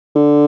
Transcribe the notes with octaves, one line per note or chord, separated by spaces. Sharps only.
D3